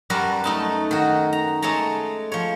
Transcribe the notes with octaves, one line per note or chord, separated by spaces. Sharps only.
F#2 G3 F#4 A#4 B4 A5
A3 D#4 A5
D#3 F#4
A#5
G#3 A3 C#5 A5 A#5
F3 C#5